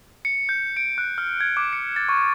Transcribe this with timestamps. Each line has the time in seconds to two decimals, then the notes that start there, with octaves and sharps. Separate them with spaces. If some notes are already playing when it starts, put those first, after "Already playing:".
0.25 C#7
0.49 G6
0.77 D7
0.98 F#6
1.18 F6
1.40 G#6
1.57 D6
1.73 C#7
1.96 A6
2.09 C#6